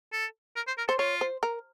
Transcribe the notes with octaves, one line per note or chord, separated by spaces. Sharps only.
A4
A#4
C5
A#4
A4 C5
F4 C#5
C5
A#4